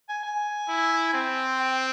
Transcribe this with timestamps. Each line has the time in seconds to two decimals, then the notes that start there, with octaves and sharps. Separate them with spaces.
0.09 G#5
0.23 G#5
0.69 E4
1.14 C4
1.59 G5